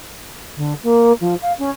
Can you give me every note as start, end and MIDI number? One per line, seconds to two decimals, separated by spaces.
0.56 0.73 50
0.83 1.12 58
1.20 1.34 53
1.41 1.52 77
1.58 1.70 61